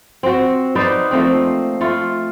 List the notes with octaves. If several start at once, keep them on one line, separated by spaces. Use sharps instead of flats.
C4 F#4
D#4 B4 C5 D5
F3 A3 A#3 C4
A3 F4